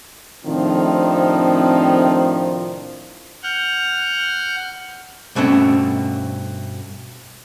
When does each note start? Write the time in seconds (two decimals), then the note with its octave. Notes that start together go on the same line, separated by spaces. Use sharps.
0.45 A2 C3 D#3 F3 C4 D4
3.43 F#5 F6 G6
5.35 G2 B2 A3 C4 C#4